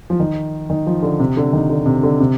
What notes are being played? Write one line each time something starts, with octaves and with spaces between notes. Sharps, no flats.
F3
D#3
D#3
F3
D3
C3
D3
D#3
D3
C3
D3
C3